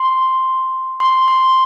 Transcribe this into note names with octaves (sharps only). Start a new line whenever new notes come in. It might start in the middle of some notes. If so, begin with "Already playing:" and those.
Already playing: C6
C6
C6